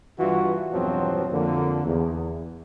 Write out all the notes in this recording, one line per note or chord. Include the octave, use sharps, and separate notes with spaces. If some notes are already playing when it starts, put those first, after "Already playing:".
G2 E3 F4 F#4
E2 G2 B2 F3 F#3 C4
F2 D3 A#3
E2